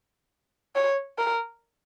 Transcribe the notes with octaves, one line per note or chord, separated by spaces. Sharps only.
C#5
A#4